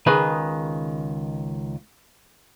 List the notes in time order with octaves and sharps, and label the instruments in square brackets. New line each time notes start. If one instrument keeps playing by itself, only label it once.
[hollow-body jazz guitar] C#2 D#3 G#4 B4